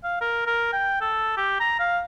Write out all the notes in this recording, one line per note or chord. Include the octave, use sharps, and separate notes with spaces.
F5
A#4
A#4
G5
A4
G4
A#5
F5